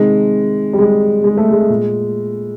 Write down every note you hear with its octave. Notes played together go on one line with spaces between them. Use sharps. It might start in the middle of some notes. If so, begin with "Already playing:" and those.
Already playing: C3 D#3 G#3
G3
G#3
G#3
A3
G#3
A#2